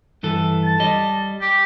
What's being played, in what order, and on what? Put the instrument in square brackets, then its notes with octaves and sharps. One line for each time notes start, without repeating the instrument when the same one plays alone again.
[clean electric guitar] G2 E3 A4
[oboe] A5
[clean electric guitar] G3 D#5
[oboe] G4